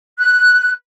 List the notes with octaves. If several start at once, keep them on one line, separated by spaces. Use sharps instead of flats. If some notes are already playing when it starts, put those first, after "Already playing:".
F#6